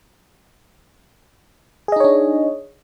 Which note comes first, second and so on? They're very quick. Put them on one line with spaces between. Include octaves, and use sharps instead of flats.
G#4 D#5 D#4 C#5 D4